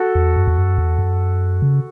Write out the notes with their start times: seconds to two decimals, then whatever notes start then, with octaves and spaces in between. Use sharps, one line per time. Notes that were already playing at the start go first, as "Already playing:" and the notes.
Already playing: F#4 A4
0.15 E2
0.36 F#2
0.47 E2
0.57 F#2
0.78 E2
0.99 F#2
1.62 C#3